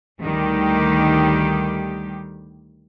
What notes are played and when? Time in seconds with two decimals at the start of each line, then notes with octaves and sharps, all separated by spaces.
0.20 D2 D#3 G3 G4